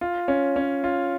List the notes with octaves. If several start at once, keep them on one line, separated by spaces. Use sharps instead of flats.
F4
C#4
C#4
F4